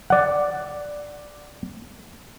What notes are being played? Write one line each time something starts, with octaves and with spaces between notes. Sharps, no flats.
D5 F#5